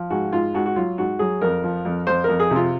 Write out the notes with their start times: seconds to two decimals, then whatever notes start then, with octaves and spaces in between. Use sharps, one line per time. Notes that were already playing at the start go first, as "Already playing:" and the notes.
Already playing: F3
0.10 G#2 F#4
0.33 G#2 F4
0.54 G#2 F#4
0.66 F#4
0.76 F#3 F4
0.98 G#2 F#4
1.19 F#3 G#4
1.41 F2 A#4
1.63 F3
1.85 F2
2.07 F2 C5
2.24 F2 A#4
2.40 G#4
2.51 C3
2.56 F4